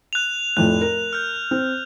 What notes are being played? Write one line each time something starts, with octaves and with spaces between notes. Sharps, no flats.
F#6 F7
F1 F2 A2 F#6
A#4
F6 G6
C4